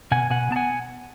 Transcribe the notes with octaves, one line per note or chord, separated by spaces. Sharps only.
B2 F#5 G#5
B2 F#5 G#5
B3 A5
F#5 G#5